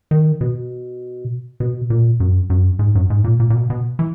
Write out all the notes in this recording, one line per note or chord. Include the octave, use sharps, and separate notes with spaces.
D#3
B2
B2
A#2
F#2
F#2
G#2
F#2
G#2
A#2
A#2
A#2
B2
B2
E3